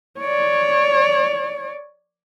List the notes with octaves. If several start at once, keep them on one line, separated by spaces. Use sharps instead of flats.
C#5 D5